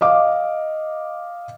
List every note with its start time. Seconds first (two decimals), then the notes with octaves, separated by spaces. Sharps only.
0.01 D#5 F5 D6